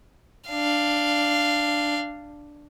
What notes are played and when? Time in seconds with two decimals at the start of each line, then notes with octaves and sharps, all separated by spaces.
0.49 D4 F5